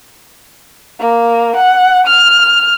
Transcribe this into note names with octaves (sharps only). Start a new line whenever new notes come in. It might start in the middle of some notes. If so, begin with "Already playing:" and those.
A#3
F#5
F6